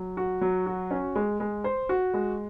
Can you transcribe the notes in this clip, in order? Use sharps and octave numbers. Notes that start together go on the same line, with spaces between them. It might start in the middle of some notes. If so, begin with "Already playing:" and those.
Already playing: F#3
F#4
F#3
F#4
C#4
G#3
G#3
C5
F#4
G#3